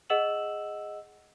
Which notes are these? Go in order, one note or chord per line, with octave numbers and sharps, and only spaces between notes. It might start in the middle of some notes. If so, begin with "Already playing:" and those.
G#4 D#5 F#5 E6 E7 F#7